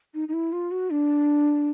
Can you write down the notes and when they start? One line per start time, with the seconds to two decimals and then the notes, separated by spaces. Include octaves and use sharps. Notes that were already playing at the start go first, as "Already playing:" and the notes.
0.14 D#4
0.28 D#4
0.33 E4
0.52 F4
0.71 F#4
0.90 D4